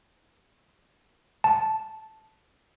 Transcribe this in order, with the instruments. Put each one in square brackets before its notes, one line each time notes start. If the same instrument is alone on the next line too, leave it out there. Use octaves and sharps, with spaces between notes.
[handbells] A5